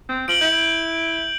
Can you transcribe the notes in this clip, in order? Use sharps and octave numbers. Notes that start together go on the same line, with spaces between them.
C4
F3 D7 F#7 G7
E4 G6